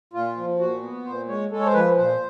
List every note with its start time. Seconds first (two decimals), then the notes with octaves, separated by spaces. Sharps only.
0.13 A#2 F4
0.37 F3
0.59 A#2 F#4
0.82 B3
1.05 A#2 C5
1.28 G#3 C#5
1.51 G#3 A4
1.60 C#5
1.66 C5
1.74 F3 B4
1.97 A#2 C5